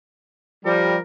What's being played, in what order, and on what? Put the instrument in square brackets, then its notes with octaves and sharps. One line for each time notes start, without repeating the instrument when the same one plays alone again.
[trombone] F3 [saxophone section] G3 [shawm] A#4